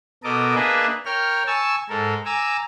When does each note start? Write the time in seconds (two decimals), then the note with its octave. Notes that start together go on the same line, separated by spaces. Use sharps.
0.24 B2 A4 A#4 D#5 D6
0.55 A#3 D4 G#4 B4 D#5 E5
1.05 A#4 C#5 G5 F6
1.47 G#5 A5 C#6 E6
1.89 G#2 A4 A#4
2.25 G#5 A#5 D6 E6